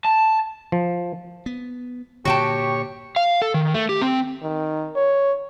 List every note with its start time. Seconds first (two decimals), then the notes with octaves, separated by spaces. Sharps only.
0.05 A5
0.72 F3
1.46 B3
2.25 G2 A#2 D3 F#4 G4 C#5 G5 A5
3.16 F5
3.42 A4
3.54 D#3
3.74 A3
3.89 G4
4.02 C4
4.43 D#3
4.96 C#5